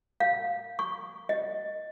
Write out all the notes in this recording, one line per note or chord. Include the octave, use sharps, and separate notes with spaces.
F5
C#6
D#5